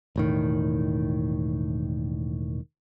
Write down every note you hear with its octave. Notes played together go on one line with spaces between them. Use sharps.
E1 A2 D#3